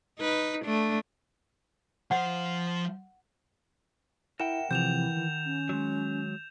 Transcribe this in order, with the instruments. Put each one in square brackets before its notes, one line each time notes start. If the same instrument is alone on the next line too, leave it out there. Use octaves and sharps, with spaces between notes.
[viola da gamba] D#4 B4
A3 D4
[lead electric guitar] F3 C5 [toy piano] F#5
[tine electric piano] E4 [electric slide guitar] A#4 F#5 G5 [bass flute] E5 [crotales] E7
[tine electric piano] C3 F3 C4 [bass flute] E3 [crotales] G6 E7 F7
[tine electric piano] D#3
[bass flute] C#4
[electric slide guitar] F#3 G#3